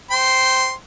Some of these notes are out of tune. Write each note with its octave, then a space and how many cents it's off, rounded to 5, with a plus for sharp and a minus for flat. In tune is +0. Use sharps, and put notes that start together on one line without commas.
C5 +0 G5 -15 C6 +0